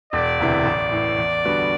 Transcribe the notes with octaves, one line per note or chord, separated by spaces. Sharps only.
E1 D5
D2 C3 E3
A1
A2 E3
E2
D3 G3 B3 F#4